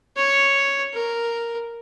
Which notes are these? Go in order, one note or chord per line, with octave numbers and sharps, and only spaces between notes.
C#5
A#4